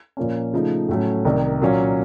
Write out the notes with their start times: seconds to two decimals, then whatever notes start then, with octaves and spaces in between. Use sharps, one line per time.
0.17 A#2 F3 A#3 C#4
0.53 C#3 F3 A3 D#4
0.89 A2 F#3 A3 C#4
1.25 C2 C3 D#3
1.61 A#2 F#3 A#3 C#4